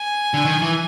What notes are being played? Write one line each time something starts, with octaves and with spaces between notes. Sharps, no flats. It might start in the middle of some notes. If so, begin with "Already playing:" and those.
Already playing: G#5
D3
D#3
E3